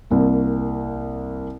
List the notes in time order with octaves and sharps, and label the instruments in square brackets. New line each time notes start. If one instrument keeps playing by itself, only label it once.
[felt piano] C2 A#3